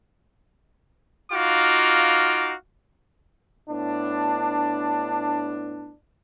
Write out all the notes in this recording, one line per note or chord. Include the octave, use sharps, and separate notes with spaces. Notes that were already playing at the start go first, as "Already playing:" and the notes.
D#4 F4 F#4 F5 D6
A2 B3 D4